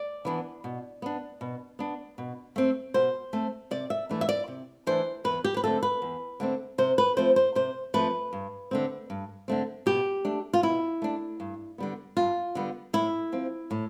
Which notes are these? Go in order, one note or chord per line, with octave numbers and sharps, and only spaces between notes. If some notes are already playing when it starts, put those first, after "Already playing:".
Already playing: D5
E3 B3 D4
B2
B3 D4
B2
B3 D4
B2
A3 C4
B2 C5
A3 C4
C3 D5
E5
E3 A3 D4
E5
D5
C3
E3 A3 D4 C5
E2 B4
G4
B4
D3 A3 C4 A4
B4
E2
D3 A3 C4
C3 C5
B4
F3 A3 C4 C5
C5
C3 C5
F3 A3 C4 B4
G2
D3 A3 C4
G2
D3 A3 C4
B2 G4
A3 D4
F4
B2 E4
A3 D4
G2
D3 G3 B3
G2 F4
D3 G3 B3
A2 E4
F3 C4
A2